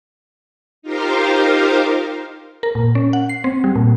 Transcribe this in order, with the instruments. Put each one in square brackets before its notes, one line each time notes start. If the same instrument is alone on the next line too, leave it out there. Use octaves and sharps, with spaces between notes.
[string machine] D#4 F4 G4 A#4 C5 F5
[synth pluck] A#4
A#2
C#4
F#5
C7
C4
G3
A#2